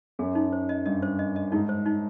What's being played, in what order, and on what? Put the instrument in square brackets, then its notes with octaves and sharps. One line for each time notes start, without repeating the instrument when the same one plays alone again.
[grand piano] F#2 [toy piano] G#4
[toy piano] D#4
C5
D#5
[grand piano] G2 [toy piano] D#5
[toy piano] C5
D#5
D#5
[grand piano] G#2 [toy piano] D#4
[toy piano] C5
D#4